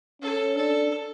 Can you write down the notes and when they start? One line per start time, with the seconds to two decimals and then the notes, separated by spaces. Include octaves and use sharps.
0.22 C#4 A4
0.56 D4 A4